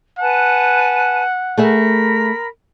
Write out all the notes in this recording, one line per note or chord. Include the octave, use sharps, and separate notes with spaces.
B4 F#5 G#5 A5
A3 G#4 A#4 E5 B5